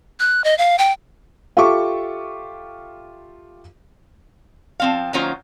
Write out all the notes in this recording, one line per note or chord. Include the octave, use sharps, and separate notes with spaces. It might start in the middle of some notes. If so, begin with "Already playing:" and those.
F#6
D#5
F5
G5
F4 G4 A4 E5 C#6 D6
F3 C4 F5
D#3 F#3 A#3 C#4 F4 C5